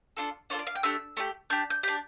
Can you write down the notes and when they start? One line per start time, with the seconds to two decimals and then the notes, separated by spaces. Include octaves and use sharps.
0.17 D4 F4 A4
0.50 D4 F4 A4 C#5
0.59 D5
0.67 F5
0.75 G5
0.83 A3 D4 G4 E6
1.17 A3 D4 G4
1.50 D4 G4 G6
1.70 G6
1.83 D4 G4 G6